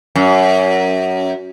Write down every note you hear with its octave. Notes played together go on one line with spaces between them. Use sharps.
F#2